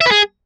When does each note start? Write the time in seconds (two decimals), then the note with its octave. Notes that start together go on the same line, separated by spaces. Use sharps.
0.01 E5
0.06 B4
0.12 G#4